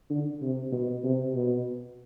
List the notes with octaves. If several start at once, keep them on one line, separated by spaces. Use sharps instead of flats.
D3
C3
B2
C3
B2